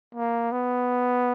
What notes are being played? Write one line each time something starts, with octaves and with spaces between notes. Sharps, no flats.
A#3
B3